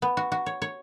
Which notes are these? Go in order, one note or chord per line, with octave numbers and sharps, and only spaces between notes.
B3
F#4
F#4
C#5
C#5